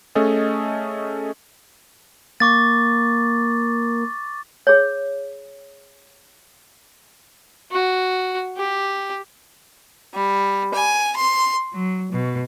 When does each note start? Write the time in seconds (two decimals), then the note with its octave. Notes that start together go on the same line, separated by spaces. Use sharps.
0.15 A3 C#4 G#4 A4 D#5
2.40 A#3 C#6 D6 A6
4.67 G#4 C#5
7.71 F#4
8.57 G4
10.14 G3
10.73 G#5
11.15 C6
11.73 F#3
12.10 B2